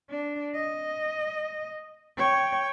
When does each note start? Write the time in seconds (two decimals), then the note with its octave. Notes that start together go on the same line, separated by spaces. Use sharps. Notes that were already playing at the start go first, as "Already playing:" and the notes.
0.11 D4
0.55 D#5
2.17 C#5 G5